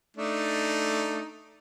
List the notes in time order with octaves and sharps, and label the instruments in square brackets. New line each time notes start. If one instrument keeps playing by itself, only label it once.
[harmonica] A3 D4 D#4